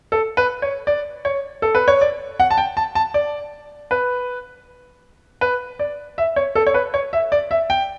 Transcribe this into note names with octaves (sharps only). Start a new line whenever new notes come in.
A4
B4
C#5
D5
C#5
A4
B4
C#5
D5
F#5
A5
G5
A5
A5
D5
B4
B4
D5
E5
C#5
A4
C#5
B4
C#5
E5
D5
E5
G5